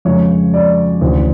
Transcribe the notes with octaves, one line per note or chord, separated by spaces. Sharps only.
F2 C#3 F3 G#3 C#5
D5
D2 C#3 E3